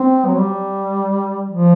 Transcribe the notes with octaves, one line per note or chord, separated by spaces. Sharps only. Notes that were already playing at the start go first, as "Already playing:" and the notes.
Already playing: C4
F#3
G3
F3